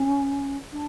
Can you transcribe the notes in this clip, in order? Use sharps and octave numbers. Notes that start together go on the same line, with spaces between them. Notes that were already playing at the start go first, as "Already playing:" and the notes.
Already playing: C#4
D4